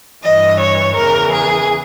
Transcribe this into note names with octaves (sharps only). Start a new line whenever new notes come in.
G2 E3 D#5
C#5
E2 C#3 E3 A#4
G#4